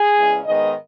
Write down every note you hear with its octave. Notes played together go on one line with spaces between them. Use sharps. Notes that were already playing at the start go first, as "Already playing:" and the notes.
Already playing: G#4
E2 C#3 E3 G#3 C#4
G#2 D#3 G#3 B3 D#5